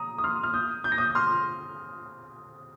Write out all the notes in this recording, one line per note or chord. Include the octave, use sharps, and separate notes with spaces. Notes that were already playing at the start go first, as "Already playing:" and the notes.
Already playing: A#5 D#6
D#6
C6 F6
F6
D#6 G6
G6
A#6
D#6 G6
C6 F6